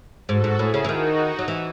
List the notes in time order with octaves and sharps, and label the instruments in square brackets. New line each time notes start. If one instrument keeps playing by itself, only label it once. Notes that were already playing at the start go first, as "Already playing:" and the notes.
[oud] G#2 [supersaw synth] F#4 A4
[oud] G#2
[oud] A2 [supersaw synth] E4 G#4
[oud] C#3
E3
[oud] D#3 [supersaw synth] D#4 F#4
[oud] F#3
E3